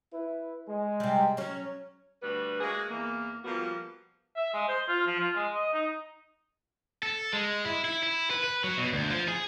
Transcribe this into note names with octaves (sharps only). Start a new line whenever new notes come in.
E4 B4
G#3
C3 G3
F#3 C#4
D2 G3 F#4 B4
G#3 A#3 F#4 G#4
E2 A#3
F3 G3 A#3 B3 F#4
E5
G#3
C5
F4
F3
F4
G#3
D#5
D#4
A4
G#3
E4
E4
E4
B4
B4
F#3
B2
D2
F3
G#4